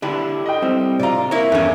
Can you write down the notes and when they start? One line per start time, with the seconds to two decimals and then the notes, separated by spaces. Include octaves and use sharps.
0.02 D3 D4 E4 G4
0.46 D#5 G5
0.62 G3 C4 E4
0.99 C3 F4 D5 A#5
1.31 A#3 E4 A#4 C#5
1.52 E2 G2 A3 C#4